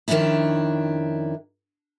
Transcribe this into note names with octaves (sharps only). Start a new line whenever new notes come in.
F2 D#3 G#3 C#4 D4 E4